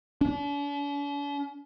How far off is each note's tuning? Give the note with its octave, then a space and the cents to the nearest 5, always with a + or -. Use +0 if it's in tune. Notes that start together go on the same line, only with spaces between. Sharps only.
D4 -45